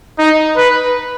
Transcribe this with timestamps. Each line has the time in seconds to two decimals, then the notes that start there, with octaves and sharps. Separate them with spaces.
0.19 D#4
0.57 B4